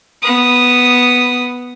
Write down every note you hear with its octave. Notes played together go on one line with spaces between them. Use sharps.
B3 D#6